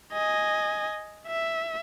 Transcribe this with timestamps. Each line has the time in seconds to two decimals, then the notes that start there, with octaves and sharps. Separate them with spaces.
0.13 D#5 G#5
1.27 E5